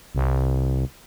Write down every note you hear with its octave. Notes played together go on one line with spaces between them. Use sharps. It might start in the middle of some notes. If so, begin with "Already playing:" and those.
C2